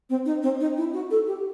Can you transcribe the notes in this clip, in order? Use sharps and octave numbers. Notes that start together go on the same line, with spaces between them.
C4
D#4
C4
D#4
E4
F#4
A4
G4